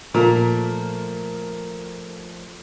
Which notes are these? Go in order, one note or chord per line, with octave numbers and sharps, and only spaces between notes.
A#2 F3 A3 A#4